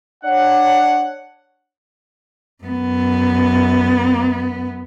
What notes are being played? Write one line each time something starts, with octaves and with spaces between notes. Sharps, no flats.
D4 C#5 F#5
F#2 B3